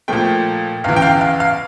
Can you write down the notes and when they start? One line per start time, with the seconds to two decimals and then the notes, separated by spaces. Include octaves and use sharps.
0.08 A#2 F3 A3 G5
0.84 E2 C#3 E3 F5
0.96 G5
1.02 F5
1.21 F5
1.40 F5